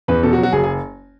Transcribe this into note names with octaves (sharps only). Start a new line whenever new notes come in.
E2 B4
B2 A4
F#4
F#3
F#4
F#1 G#4
G#4